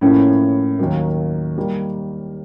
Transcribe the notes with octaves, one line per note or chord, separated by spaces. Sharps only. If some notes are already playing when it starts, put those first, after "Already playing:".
A2 F3 A#3 C#4 E4
D#2 D#3 F#3 A#3
D#3 G3 A#3